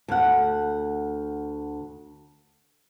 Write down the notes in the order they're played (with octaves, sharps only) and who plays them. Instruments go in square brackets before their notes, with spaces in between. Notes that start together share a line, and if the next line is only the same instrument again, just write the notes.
[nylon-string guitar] D2 F#5